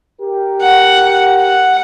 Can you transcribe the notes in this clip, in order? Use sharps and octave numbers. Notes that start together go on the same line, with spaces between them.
G4 A#4
F#5
F#5